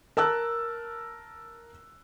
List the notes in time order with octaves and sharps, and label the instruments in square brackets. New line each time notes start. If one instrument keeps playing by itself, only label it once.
[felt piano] A#4 A5 E6 F#6